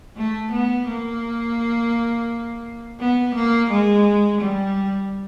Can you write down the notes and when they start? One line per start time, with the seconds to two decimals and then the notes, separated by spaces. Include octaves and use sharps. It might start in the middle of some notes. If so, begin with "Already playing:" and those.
0.17 A3
0.52 B3
0.87 A#3
3.00 B3
3.35 A#3
3.71 G#3
4.41 G3